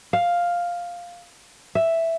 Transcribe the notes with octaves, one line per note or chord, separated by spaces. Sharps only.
F5
E5